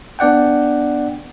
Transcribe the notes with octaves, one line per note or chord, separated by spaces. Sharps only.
B3 D4 D5 F#5 G5